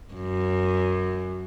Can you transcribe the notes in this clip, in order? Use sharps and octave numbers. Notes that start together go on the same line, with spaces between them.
F#2